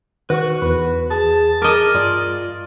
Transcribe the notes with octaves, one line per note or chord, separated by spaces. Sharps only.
D#3 F#4 B4 C#6
E2 B4
G#4 A5
G#4 A#4 D#5 D6
G2 F4 D5